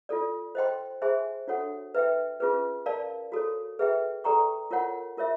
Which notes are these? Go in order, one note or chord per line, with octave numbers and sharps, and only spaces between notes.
F4 A4 D5
C5 D#5 G5 C6
G#4 C5 E5 G#5 C6
D4 F#4 A4 C#5 F#5
B4 E5 G5
C#4 F4 G#4 B4
A#4 D5 F5 A5
F#4 A4 C#5
G#4 B4 E5 G5
A4 D5 G5 A#5 C#6
F4 A#4 C#5 F#5
F4 A#4 C#5 E5